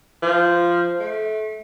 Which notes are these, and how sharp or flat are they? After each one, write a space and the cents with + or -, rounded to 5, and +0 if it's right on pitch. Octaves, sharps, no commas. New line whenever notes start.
F3 -10
A3 -30